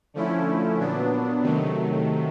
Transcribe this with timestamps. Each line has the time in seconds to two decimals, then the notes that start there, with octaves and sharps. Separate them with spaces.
0.14 D3 F3 A3 C#4 E4
0.78 A#2 F#3 B3 D4
1.41 C3 D#3 F#3 A3